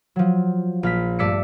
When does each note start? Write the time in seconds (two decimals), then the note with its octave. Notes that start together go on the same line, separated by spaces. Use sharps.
0.16 F3 F#3
0.83 A#1 F6 B6
1.19 G2 A3 D5 E6 B6 C#7